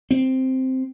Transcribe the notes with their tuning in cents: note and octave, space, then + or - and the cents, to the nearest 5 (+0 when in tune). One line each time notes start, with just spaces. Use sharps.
C4 -5